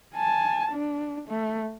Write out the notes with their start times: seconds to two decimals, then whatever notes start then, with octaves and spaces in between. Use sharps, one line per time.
0.15 G#5 A5
0.72 D4
1.29 A3